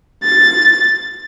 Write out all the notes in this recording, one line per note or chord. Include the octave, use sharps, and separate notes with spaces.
A6